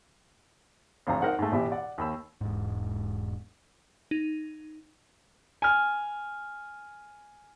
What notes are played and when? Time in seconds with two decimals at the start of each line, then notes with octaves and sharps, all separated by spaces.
1.07 G#1 D2 F3 C5 A#5
1.22 D#4 A#4 C5 F#5
1.39 G#2 A3
1.52 A1 B2 E3 G4 E5
1.72 D5 F#5
1.98 D#2 B5 E6
2.41 E1 G#2
4.11 D#4
5.62 G#5 F6